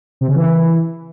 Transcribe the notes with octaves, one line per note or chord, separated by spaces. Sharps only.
C3
C#3
E3